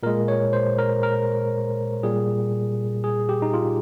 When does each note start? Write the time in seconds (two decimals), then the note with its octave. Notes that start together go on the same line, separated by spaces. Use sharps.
0.03 A#2 G#3 A#4
0.28 C#5
0.53 C5
0.78 A#4
1.03 A#4
2.03 A#2 G3 G#4
3.04 G#4
3.29 G4
3.42 D#4
3.54 F4